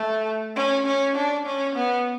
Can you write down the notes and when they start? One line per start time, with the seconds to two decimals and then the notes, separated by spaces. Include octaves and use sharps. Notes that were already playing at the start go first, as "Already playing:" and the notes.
Already playing: A3
0.56 C#4
0.86 C#4
1.16 D4
1.46 C#4
1.75 B3